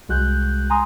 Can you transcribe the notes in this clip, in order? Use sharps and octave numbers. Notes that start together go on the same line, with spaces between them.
C2 G#3 F#4 F#6 G6
G#5 A#5 C6 D#6